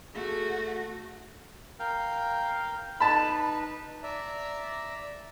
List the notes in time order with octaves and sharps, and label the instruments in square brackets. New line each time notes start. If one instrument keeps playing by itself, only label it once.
[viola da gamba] A3 [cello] F#4 [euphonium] G#4
[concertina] A#4 F5 G5
[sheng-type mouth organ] D#4 B4 [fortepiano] A5 B5
[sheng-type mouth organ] D5 E5 A#5